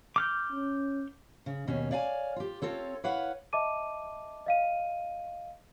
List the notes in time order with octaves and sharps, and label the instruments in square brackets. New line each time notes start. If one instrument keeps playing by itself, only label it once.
[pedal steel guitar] D6 F6 G6
[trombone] C#4
[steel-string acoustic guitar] C#3
D#2 B2 C#4
C#5 D5 F5 G5 G#5
F4 G4
C4 F4 A4 C#5
E4 B4 C#5 F5 F#5
[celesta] D#5 E5 A5 D6 D#7
D#5 F5 D#7